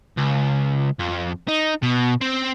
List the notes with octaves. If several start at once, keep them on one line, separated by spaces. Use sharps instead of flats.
C#2
F2
D#4
B2
C4